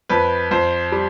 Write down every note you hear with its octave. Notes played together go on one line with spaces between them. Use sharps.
F2 B4
F2 C5
G3